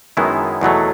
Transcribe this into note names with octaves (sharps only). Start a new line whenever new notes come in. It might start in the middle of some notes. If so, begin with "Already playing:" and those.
F#2 D#3 G#3 B3 E4
E2 B2 F#3 A3